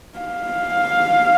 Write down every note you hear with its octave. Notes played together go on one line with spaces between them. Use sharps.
F5